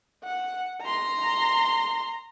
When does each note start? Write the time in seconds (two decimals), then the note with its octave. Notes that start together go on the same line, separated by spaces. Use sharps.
0.24 F#5
0.81 A#5 C6